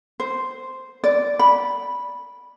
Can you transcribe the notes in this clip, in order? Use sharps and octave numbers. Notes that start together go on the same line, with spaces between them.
C5
D5
B5